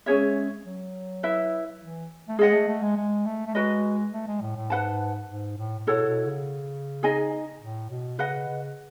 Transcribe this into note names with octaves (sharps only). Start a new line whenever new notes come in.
G#3 C#4 G#4 C#5 E5
F#3
E4 B4 E5
E3
A3
G#3 G#4 D#5 F#5
A3
A3
G#3
G#3
A3
A3
G#3 F#4 B4 D#5
A3
G#3
A2
A2
G#2 B4 F#5 A5
G#2
A2
A2
B2 E4 A4 C#5 F#5
B2
C#3
D#4 G#4 D#5 G#5
A2
B2
C#3 B4 D#5 F#5
C#3